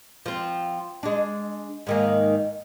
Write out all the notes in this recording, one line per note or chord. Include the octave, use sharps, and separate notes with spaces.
F3 C4
G#3 D4
G#2 D#3 A#3